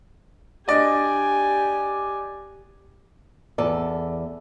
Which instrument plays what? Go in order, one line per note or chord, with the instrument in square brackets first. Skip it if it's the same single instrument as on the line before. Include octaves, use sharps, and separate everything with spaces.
[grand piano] D4 D5 D#5 [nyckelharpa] G4 G#5
[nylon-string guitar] E2 A4 D5